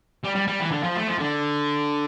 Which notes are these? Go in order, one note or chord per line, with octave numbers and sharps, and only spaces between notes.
G3
G3
G3
E3
D3
F3
A3
F3
D3